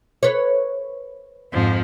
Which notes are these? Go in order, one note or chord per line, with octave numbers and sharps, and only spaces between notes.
B4 C#5
F2 G#2 F3